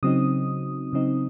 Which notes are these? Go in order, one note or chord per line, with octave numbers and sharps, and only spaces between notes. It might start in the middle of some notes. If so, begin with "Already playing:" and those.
C#3 F#3 C4 D#4 D#6
C#3 F#3 C4 D#4